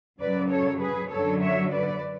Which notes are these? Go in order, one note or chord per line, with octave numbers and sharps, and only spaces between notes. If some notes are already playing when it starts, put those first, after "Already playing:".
F#2 C#3 F#3 B4 D5
A4 C#5
G#4 B4
F#2 D3 F#3 A4 C#5
C#5 E5
B4 D5